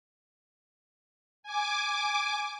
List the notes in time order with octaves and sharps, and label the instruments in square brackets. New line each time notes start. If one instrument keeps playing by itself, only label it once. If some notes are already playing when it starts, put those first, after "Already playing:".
[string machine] G#5 D6